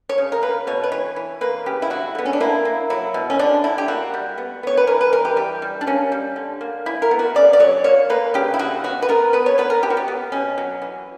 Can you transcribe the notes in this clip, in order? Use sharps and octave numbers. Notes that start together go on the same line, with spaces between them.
C#5
C#3
A#4
A#3 B4
B2 C#5
B4
E3 C#5
E3
A#3 B4
C#3 G4
E4
F#3 F#4
D3 B3
C#4
D4
A#3 E4
A#3
F#3 E4
B2
C#4
D3 D4
D3 E4
G4
A#3 F#4
G3
B3
B3 C#5
B4
E3 A#4
B4
E3 A#4
G4
G3 G4
G3
D4
A#3 C#4
G3
D3
A#3
E3 E4
A#4
B3
F#4
C#3 D5
D5
F#3 C#5
A#3 C#5
A#3 B4
C#3 G4
E4
C#3 F#4
B3 F#4
B4
B3 A#4
B3 B4
C#5
B3 B4
A#4
B3 G4
F#4
G4
B3
B2 C#4
F#3
E3